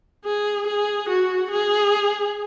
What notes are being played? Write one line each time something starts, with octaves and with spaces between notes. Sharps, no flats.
G#4
G#4
F#4
G#4